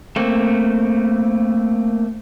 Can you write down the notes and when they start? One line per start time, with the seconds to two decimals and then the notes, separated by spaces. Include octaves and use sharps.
0.16 A3 A#3 C4